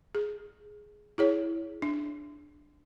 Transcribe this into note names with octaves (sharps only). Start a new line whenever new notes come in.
G#4
E4 G#4 C#5
D4